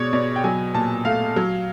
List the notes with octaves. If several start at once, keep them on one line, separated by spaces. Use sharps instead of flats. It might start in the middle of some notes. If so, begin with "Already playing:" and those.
Already playing: B2 G#3 C#5 D5
B2 D5
G5
F#3 G#5
A#2 A5
A3 F5
F#3